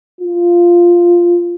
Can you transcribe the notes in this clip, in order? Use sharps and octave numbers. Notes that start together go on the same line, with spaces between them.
F4